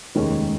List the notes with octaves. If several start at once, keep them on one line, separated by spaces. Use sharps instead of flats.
F1 D#2 D#3 G#3 C#4